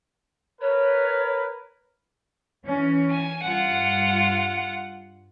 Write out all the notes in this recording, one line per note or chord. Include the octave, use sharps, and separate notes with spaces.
A#4 B4 C#5
E3 C#4
G#5
G2 F4 F#5